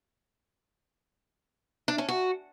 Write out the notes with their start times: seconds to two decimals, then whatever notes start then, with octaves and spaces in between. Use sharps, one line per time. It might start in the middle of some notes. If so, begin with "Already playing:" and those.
1.88 D4
1.98 C#4
2.08 F#4